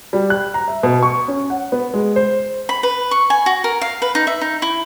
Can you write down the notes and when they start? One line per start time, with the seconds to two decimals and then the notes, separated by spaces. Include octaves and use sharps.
0.13 G3
0.30 F#6
0.54 A#5
0.68 E5
0.83 B2
1.03 C#6
1.28 C#4
1.50 F#5
1.72 B3
1.94 G#3
2.16 C5
2.69 B5
2.83 B4
3.11 C#6
3.30 G#5
3.46 F#4
3.64 A#4
3.81 F5
4.02 B4
4.15 D#4
4.27 E5
4.41 D#4
4.62 E4